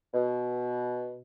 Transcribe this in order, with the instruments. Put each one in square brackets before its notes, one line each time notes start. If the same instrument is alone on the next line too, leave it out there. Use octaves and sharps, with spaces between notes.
[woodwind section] B2